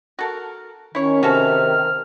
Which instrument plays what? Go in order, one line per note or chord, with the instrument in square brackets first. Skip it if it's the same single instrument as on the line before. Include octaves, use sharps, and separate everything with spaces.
[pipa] F#4 A4 A#4
[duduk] D#3 [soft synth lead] C#4 [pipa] E4 C#5
[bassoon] C3 [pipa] C#4 F#4 A4 [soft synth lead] F6